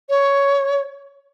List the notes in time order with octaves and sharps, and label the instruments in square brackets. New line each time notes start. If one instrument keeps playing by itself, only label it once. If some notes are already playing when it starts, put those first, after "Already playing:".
[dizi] C#5